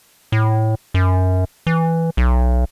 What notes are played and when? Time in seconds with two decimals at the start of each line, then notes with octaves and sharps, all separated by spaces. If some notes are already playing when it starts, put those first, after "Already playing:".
0.32 A2
0.94 F#2
1.67 E3
2.17 B1